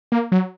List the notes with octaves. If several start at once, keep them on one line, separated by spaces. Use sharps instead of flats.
A#3
F#3